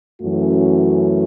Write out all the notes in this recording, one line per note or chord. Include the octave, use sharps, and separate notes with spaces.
F#2 E3 A3 C#4 F#4